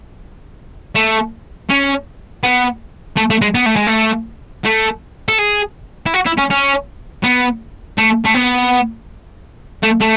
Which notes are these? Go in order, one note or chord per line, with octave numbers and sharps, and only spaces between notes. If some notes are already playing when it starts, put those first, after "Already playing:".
A3
C#4
B3
A3
A3
G#3
B3
A3
G#3
A3
A3
A4
G#4
E4
F#4
E4
C#4
C#4
B3
A3
A3
B3
A3
A3